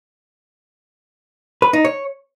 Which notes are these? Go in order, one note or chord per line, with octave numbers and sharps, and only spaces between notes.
B4
D#4
C#5